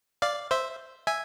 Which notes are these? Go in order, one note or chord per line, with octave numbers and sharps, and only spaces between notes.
D5 F5
C5 E5
E5 G#5